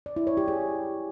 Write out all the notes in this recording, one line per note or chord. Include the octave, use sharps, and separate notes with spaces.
D5
E4
C#5
G4
G#4